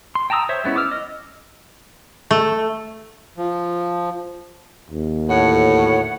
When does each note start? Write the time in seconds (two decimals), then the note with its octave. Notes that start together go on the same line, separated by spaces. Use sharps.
0.15 C6
0.30 G5 A5 A#5 D#6 E6
0.49 C5 C#5 E5
0.64 G#3 B3 C#4 E4
0.76 D6 E6 F6
0.91 D#5
2.31 A3
3.37 F3
4.91 D#2
5.29 D2 A2 A3 C#5 F#5